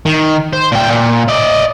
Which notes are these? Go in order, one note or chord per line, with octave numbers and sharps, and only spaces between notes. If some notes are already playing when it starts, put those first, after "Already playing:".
D#3
C5
A#2 G5
A#2
D5 D#5